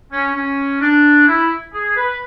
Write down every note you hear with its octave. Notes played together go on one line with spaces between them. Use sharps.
C#4
C#4
D4
E4
G#4
B4